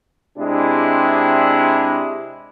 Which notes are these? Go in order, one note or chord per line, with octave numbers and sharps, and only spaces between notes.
C3 G#3 D4 E4 G4